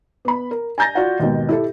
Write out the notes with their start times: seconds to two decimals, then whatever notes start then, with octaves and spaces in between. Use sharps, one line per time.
0.25 B3 B5
0.51 A#4
0.78 G#5 A#5 G6 A6 A#6
0.95 F4 F#4 D5 F5 F#5
1.20 D#2 G#2 B2
1.49 E4 G4 A4